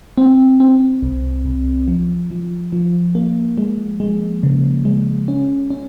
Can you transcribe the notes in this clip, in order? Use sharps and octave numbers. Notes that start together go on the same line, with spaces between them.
C4
C4
C2
C2
F3
F3
F3
A#3
G#3
G#3
C#3
G#3
C#4
C#4